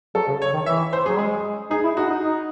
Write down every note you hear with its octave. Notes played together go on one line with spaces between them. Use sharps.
F#3 A4
C#3
C#5
D#3
E3 E5
C5
F#3 G#4
G#3 G#4
D#4 G#4
E4
D#4 F#4
D#4
D#4